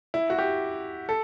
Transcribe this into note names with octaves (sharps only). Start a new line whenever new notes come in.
E4
F#4
G4
A4